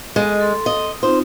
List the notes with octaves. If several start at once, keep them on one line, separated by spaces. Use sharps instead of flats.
G#3 A4 D#5
A4 C6
D#5
C4 D#4 F4 C5